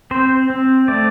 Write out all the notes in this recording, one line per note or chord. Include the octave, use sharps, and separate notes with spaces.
C4 C5
C4
A3 D5